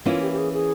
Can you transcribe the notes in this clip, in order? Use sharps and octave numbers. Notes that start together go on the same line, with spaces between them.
E3 A#3 C#4 E4 F4
G4
G4
G#4
G#4